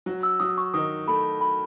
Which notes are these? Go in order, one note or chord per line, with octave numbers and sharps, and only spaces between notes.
F#3
E6
F#3 D#6
C#6
D#3 D#6
A3 B5
B5